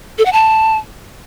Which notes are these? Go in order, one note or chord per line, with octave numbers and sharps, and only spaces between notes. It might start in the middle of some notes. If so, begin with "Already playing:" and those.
A4
F#5
A5